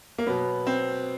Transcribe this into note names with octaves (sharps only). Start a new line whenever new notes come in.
A#3
B2 F#3 B3
C4